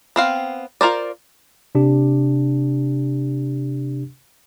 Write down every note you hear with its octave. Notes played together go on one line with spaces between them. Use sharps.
B3 C4 F5
F4 A#4 C5 D5
C3 D4 G4